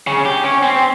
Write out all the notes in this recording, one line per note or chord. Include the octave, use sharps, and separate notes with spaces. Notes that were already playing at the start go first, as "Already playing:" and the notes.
C#3
G4
C#4
C4